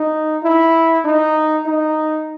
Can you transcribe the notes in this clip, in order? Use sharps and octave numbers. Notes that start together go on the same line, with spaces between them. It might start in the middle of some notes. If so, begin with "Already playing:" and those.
Already playing: D#4
E4
D#4
D#4